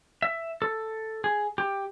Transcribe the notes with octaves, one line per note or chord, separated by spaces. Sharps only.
E5
A4
G#4
G4